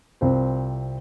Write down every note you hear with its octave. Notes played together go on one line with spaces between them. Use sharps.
C2 C4 F4 C5